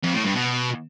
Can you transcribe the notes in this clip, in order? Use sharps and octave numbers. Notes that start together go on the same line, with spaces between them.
F2
A2
G2
B2